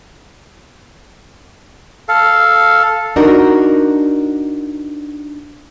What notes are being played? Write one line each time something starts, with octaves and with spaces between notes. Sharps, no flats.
A4 F5
D4 D#4 F#4 A#4